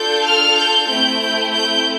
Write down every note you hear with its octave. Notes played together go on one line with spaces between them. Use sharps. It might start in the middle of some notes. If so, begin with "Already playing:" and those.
Already playing: D4 F4 A4 G6
F6
G6
A3 C4 E4 G6
G6
G6